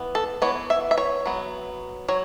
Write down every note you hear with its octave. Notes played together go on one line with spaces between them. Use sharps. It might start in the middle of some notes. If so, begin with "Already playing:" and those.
Already playing: E3 B3
A4
E3 B3 C#5
E5
E5
C#5
F#3 B3
F#3 C#5